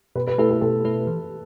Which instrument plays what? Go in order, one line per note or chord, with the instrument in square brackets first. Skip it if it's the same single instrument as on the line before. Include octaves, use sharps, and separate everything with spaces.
[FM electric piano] B2 [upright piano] B4
[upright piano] B4
[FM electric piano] A3 E4 B4 [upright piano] A4
[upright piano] A4
[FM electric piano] B2 [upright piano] A4
[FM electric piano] A3 E4 B4
E3